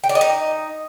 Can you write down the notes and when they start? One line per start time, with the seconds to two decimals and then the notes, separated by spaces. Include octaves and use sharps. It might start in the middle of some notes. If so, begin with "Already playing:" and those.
0.04 G5
0.09 D5
0.15 D#5
0.21 D#4